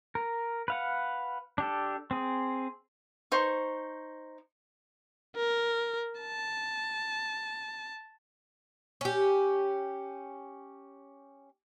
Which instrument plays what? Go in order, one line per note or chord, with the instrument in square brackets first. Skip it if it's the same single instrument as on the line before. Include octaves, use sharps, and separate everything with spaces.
[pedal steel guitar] A#4
B4 F5 F#5
D4 G4 A4
C4 G#4
[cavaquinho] D#4 C5 C#6
[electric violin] A#4
A5
[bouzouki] C#4 G4